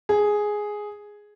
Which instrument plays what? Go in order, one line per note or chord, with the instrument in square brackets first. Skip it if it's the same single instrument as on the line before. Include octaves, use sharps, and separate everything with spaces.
[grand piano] G#4